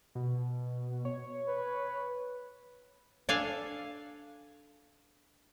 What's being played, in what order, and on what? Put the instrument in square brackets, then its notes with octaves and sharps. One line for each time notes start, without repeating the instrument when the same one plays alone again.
[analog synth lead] B2
C#5
[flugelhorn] B4
[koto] D4 A4 F5 G#5